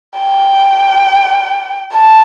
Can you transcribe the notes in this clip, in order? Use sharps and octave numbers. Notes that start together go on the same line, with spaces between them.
G5
A5